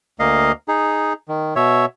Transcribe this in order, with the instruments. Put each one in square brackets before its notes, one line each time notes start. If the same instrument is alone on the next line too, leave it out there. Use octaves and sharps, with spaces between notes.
[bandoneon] D2 A#3 D#5 F5
D#4 G#4
D#3
B2 C#5 E5